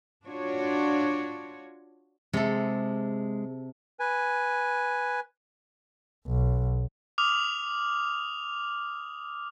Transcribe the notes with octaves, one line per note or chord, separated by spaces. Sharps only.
D4 F4 F#4 C#5
C3 G#3 A4
B4 G#5
B1
D6 D#6 F6 F7